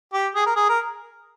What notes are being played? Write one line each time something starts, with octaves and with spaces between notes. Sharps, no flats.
G4
G#4
A#4
G#4
A#4